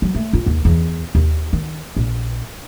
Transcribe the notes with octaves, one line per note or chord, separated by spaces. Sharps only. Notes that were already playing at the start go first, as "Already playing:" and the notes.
F#3
A3
F4
D#2
E2
D#2
D#3
A#1